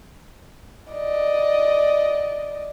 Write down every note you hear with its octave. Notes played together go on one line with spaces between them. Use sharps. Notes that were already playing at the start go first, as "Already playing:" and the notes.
D5 D#5